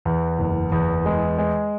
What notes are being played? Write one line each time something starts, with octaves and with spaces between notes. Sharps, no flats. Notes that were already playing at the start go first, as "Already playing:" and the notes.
E2
F#1
E2
G#3
G#3